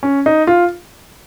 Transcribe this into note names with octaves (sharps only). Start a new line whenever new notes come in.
C#4
D#4
F4